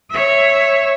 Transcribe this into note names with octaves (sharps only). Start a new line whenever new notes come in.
C#5 E5